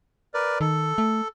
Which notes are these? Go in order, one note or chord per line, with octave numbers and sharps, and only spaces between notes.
A#4 B4 D5
D#3 A4
A3